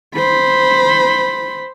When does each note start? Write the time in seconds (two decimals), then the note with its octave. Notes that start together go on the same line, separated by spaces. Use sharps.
0.15 C5 B5